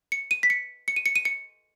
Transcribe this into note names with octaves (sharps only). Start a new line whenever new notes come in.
C#7
D#7
B6
C#7
C#7
D#7
C#7
D#7
C#7